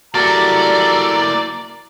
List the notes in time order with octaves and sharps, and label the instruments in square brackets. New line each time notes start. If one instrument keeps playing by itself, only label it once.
[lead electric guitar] A#3 E4 [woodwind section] F#4 G4 A4 [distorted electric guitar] D5 [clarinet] A#5